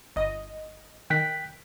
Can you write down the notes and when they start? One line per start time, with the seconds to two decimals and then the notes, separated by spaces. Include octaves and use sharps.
0.16 G1 D#5
1.10 D#3 G5 F#6 B6